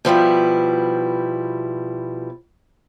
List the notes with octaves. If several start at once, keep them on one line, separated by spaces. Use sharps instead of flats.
B2 F3 G3 E4